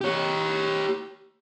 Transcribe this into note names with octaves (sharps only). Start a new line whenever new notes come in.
G4 C#5